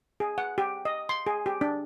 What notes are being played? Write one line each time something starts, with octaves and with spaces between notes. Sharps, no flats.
G#4
F#5
G4
D#5
C6
G#4
G4
D4